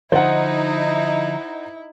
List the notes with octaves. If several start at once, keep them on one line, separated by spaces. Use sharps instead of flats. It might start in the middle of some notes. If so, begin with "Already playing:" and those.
D3 F3 D#4 E4 C5 F#5